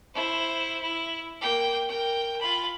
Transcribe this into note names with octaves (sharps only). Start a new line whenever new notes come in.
E4 C5
E4
A#3 G5
A#4 G5
F4 B5